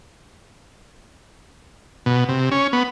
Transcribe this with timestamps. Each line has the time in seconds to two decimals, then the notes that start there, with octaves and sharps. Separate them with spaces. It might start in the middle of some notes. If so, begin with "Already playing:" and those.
2.06 B2
2.29 C3
2.51 C#4
2.73 B3